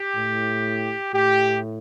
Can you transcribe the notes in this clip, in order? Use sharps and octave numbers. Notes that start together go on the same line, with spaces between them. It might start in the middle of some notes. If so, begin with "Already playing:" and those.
Already playing: G4
A2
A2 G4